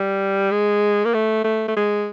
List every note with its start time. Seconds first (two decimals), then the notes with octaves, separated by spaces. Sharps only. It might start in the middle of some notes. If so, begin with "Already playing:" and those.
Already playing: G3
0.51 G#3
1.05 A#3
1.14 A3
1.44 A3
1.68 A3
1.76 G#3